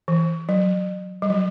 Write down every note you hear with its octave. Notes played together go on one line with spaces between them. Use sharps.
E3
F#3
G3
F#3